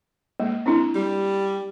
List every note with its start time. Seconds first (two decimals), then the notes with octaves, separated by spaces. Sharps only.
0.40 G#3 A#3
0.66 C4 D4 E4
0.95 G3